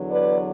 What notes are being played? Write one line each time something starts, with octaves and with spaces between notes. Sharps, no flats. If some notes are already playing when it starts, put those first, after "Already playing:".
Already playing: E2 D3 F#3
B4 D5